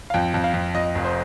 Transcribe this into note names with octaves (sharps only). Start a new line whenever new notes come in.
F5
F2 G5
F2
F5
F2
F2 D#5
F1
C5